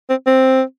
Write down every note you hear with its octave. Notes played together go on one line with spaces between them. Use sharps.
C4
C4